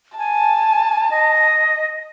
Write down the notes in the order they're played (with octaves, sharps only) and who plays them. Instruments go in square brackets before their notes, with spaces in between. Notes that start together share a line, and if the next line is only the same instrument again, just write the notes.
[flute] G#5 [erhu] A5
[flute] D#5